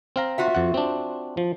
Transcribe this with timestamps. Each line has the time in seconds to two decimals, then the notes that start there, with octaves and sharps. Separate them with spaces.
0.16 C4 F5 A#5
0.38 F4 F#4 E5
0.55 F2 F#5
0.74 C4 D4
1.37 F3